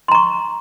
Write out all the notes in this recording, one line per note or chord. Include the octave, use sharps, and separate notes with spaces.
A#5 C6 C#6